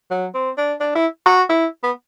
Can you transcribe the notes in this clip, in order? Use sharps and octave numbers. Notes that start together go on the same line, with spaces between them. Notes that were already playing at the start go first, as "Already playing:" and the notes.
F#3
C4
D4
D4
E4
F#4
E4
B3